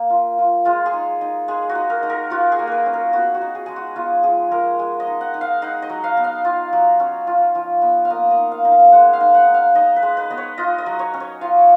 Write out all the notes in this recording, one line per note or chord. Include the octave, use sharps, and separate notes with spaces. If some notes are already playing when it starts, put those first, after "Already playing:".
Already playing: A#3
F4
F4
G#3 F4
G#4
D#4
D#4
G#3 G#4
F#4
D#4
A#4
D#4
A#4
F4 F#4
G#4
A#3
A#4 B4
C#4
A#4
B3 F#4
F#4
D#4
G#4
G#3 G#4
F#4
B3 F4
F3 G#4
G#3 A#4
G#3
D#5
D#4
F#5
D#4
F5
D#4 F#5
D#5
F#3
F5
B3
F5
F4
F#3
C#4
F4
F3
B3
F5
A#3 D#5
D#5
D#4
F5
D#4
F5
G#3 F#5
F5
D#4
F#5
D#4
F5
D#4 D#5
B4
G#3
B4
B3 D#5
C#5
F4 D#5
D#5
F#3
C#5
C#4
C#5
F4 F5